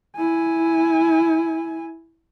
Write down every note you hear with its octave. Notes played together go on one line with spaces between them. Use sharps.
E4 G#5